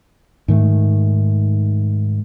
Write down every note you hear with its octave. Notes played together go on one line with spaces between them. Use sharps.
G#2 D#3 A3